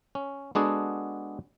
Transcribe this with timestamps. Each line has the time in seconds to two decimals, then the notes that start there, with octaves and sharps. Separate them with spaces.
0.15 C#4
0.55 G#3 B3 D4 F#4 G#4 A4